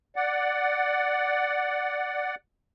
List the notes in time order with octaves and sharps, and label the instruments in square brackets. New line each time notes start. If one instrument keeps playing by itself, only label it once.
[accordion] D5 F#5